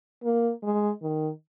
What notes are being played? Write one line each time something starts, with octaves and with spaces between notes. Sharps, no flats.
A#3
G#3
D#3